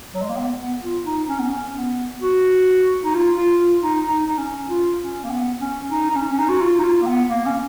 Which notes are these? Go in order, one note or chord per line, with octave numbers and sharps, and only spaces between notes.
F#3
G#3
A#3
B3
B3
F4
D#4
C#4
B3
C#4
B3
F#4
D#4
F4
F4
F4
D#4
D#4
D#4
C#4
F4
C#4
A#3
B3
C#4
D#4
D#4
C#4
C#4
D#4
F#4
F4
D#4
F4
A#3
B3
A#3
C#4